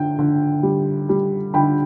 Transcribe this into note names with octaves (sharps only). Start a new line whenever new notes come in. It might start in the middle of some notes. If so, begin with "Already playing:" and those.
Already playing: D3 G5
D3
G3
G3
D3 G5 B5